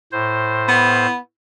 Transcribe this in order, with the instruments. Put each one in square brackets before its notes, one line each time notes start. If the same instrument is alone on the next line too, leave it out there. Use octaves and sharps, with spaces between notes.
[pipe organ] A2 C5
[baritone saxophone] B3